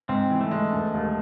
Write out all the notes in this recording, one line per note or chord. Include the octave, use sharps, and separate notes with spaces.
G#2 C4
E3
A3
G#3
E1
D#2